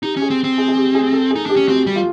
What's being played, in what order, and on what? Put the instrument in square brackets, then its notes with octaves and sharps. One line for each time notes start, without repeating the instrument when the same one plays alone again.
[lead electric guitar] D#4 [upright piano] G4
[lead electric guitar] C#4
[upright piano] G#4
[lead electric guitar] C4
C4
[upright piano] G#4
G#4
G4
G#4
A4
[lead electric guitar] D#4 [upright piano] G#4
[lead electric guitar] D4 [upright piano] G4
[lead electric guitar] C#4
[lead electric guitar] C4 [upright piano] F#4
[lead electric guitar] G3
[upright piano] F4